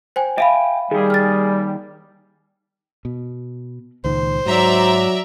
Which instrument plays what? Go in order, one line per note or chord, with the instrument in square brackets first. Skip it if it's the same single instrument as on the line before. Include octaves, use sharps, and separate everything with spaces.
[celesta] C5 G5 G#5
[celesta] E5 F5 B5 [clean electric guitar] G5 G#5
[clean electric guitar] D#3 G4 [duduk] G3 [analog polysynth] G#4
[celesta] F6 A6
[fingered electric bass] B2
[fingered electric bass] C#2 A#2 D#3 [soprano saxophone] C5
[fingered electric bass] G#2 [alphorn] F#3 [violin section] D5 E5 A#5